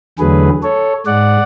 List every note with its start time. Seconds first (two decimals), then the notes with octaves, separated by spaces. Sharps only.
0.19 E2 D3 F#3 A3 G#4 B4
0.63 A4 C#5
1.06 G#2 G#3 D5 F#5